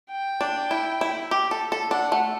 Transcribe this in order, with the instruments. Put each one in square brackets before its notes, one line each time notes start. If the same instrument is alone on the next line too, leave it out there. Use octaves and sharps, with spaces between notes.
[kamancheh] G5
[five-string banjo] D4
E4
E4
G4
A4
A4
[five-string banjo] D4 [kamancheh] F#5
[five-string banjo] A3